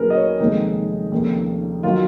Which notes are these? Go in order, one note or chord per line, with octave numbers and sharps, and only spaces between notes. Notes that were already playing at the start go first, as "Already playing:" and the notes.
Already playing: D#2 C#3 F#3 G#4 A#4 B4
D#5
C#5
F1 D#2 D#3 G#3 D#4
F1 D#2 C#3
D#3 F#3 F4